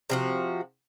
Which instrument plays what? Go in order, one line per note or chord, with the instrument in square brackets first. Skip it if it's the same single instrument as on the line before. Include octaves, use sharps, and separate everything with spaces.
[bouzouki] C3 F3 F#4